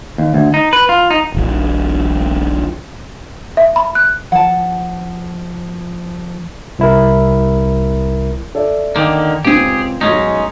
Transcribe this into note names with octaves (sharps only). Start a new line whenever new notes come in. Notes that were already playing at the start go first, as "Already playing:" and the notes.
D#2
D2
D#4
B4
F4
D#4
D#1 A#1
E5
B5
F#6
F3 F#5 A5
C2 E4 A#4
A4 D5 E5
D3 D#3 A#3 G5 D6 G6
C#2 C4 G4 G#4
B1 G#2 G#3 C#4 D#4